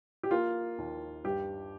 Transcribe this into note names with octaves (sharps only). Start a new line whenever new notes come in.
G4
A#3 F4
D#2
G2 G4